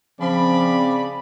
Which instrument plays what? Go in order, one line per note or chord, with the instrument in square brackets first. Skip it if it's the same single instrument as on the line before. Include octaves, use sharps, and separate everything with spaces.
[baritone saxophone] C#3 [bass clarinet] F3 [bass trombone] C4 [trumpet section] D5 B5